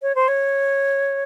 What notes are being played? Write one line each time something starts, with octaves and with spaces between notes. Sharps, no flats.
C#5
C5
C#5